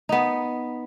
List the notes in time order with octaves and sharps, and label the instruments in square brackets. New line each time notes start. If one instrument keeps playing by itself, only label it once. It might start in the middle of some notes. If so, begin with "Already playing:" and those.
[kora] B3 D#4